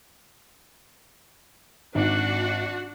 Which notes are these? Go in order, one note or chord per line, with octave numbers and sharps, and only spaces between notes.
G#1 D4 F#4